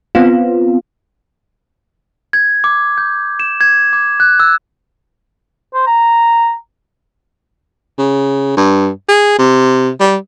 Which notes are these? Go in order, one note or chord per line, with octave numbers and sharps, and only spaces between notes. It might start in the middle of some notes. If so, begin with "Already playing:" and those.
B3 C4 F4
G#6
D6
G6
E7
G#6
D6
F#6
E6
C5
A#5
C#3
G2
G#4
C3
G3